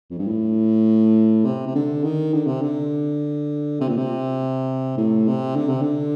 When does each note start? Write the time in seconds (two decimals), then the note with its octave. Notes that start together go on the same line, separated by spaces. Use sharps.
0.10 F2
0.19 G2
0.27 A2
1.45 C3
1.67 C3
1.75 D3
2.04 D#3
2.34 D3
2.47 C3
2.62 D3
3.81 C3
3.88 A#2
3.97 C3
4.97 A2
5.27 C3
5.56 D3
5.69 C3
5.82 D3